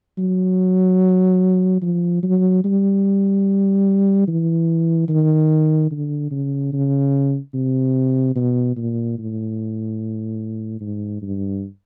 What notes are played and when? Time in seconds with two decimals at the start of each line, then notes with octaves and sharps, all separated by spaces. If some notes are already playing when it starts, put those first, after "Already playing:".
0.18 F#3
1.82 F3
2.23 F#3
2.64 G3
4.28 E3
5.09 D#3
5.91 D3
6.31 C#3
6.73 C#3
7.54 C3
8.35 B2
8.76 A#2
9.18 A2
10.80 G#2
11.22 G2